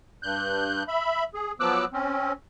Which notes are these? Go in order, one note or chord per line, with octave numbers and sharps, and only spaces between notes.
G2 F#6 G6
E5 B5
G#4
F3 F#3 B3 D6 E6 F#6
C4 C#4